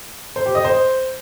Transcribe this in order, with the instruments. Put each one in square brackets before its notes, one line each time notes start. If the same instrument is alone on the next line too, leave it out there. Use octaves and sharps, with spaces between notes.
[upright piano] C5
G4
D#5
C5